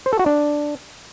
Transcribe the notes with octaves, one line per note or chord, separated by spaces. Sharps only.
C5
A4
F#4
D4